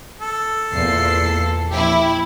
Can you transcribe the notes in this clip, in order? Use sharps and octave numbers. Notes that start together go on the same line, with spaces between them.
A4
E2 A#2 C7
A#1 E4 G4